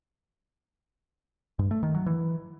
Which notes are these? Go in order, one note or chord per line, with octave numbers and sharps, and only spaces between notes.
G2
A3
D#3
F#3
E3